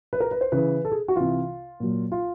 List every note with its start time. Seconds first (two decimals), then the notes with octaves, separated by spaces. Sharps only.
0.13 B4
0.20 A#4
0.31 B4
0.41 C5
0.52 C#3 E3 B4
0.85 A4
0.92 G#4
1.08 F#4
1.16 C3 E3 F4
1.80 A#2 F#3
2.12 F4